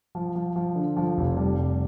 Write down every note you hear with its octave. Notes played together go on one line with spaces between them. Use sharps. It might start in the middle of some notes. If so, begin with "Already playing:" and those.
F3
F3
F3
D3
F3
F1
G3
F1